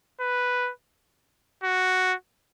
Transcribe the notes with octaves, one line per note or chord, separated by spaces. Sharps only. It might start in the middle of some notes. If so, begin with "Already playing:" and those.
B4
F#4